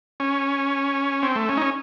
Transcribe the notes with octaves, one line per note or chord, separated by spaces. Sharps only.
C#4
C4
A3
C#4
D#4
C#4